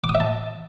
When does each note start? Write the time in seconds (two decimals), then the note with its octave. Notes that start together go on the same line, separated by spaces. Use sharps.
0.04 D6
0.09 D#6
0.15 E5
0.20 A5